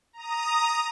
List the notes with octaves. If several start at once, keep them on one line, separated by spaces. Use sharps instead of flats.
A#5 D#6